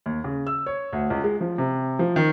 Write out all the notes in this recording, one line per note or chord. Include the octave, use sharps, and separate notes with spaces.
D#2
C#3
E6
C#5
D2
C#2
G#3
F3
C3
F3
D#3